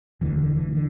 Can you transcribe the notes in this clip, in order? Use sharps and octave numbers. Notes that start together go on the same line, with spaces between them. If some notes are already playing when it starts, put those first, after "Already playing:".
E1 D2 D3 E3
D3
E3
D3